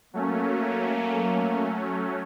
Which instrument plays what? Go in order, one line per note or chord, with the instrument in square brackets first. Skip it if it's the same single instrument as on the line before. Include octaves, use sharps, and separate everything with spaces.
[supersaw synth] F#3 A3 C#4 [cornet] A#3